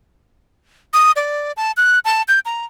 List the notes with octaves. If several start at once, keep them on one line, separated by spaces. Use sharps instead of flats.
D#6
D5
A5
F#6
A5
G6
A#5